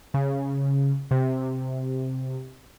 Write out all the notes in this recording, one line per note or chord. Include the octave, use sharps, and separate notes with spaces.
C#3
C3